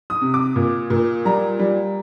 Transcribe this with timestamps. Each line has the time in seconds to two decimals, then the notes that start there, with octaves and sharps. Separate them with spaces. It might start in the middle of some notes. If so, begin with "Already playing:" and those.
0.10 D#6
0.21 C3
0.34 D6
0.56 A#2
0.90 A#2
1.25 G3 A#5
1.59 G3